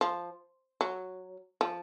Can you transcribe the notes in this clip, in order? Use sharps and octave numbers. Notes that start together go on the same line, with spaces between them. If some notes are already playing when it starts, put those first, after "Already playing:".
F3
F#3
F3